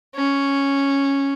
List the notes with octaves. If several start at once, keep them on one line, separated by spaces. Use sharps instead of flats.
C#4